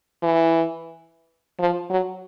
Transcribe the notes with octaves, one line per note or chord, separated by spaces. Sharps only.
E3
F3
F#3